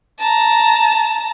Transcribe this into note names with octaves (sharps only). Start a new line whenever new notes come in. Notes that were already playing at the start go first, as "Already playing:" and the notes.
A5 A#5